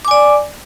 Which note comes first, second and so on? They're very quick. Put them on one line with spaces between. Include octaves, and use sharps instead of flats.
D6 G#5 D5